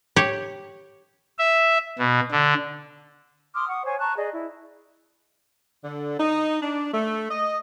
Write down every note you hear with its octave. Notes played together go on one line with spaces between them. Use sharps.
G4 C#5
E5
B2
D3
C6 D6 D#6 F6
F#5 C#6 D#6
C5 C#5 G#5 C#6
A5 A#5 C#6 F#6
G#4 D5 D#5
E4
D3
D#4
D4
A3
D#5